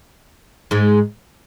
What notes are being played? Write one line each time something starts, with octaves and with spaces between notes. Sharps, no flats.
G#2 G#3